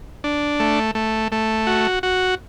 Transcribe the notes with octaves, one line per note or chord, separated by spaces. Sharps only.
D4
A3
A3
A3
F#4
F#4